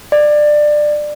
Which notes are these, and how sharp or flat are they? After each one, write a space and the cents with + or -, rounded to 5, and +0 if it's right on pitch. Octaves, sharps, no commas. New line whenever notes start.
D5 +20